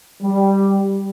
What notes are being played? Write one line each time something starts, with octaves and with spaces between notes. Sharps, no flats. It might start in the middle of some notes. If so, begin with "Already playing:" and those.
G3